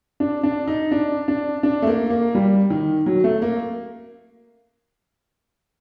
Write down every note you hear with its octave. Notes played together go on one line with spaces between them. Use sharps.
D4
D4
D#4
D4
D4
D4
A3
A#3
A#3
G3
D#3
F#3
A3
A#3